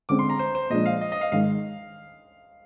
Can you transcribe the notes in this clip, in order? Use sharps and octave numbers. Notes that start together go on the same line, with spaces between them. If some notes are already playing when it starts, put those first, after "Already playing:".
D3 G#3 C4 D6
C6
A#5
C5
C5
A#2 F3 G#3 D4 D#5
F5
D#5
D#5
F5
G#2 D#3 G#3 D#4 F5